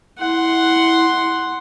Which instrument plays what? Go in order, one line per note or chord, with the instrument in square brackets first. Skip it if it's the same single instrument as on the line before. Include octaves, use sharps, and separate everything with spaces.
[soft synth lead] E4 [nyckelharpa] F#5 C6